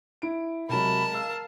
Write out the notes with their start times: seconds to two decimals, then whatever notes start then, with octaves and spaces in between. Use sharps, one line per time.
0.22 E4 D7
0.69 C3 F#3 G#3 A#4 A5 B5
1.15 F5 E6